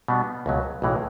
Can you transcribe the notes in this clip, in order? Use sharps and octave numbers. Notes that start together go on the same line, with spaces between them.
B2 G3 B3 D4
C#2 B2 F#3
B1 A2 E3 G#3